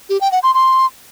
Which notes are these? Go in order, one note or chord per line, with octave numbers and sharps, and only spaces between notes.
G4
G5
F#5
C6
C6